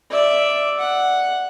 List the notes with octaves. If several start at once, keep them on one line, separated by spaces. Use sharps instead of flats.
D5 E5
F#5